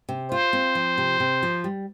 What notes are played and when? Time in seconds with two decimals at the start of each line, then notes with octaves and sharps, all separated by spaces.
0.09 C3
0.31 F4 C5
0.53 C4
0.75 F3
0.98 C3
1.20 C3
1.43 F3
1.64 G3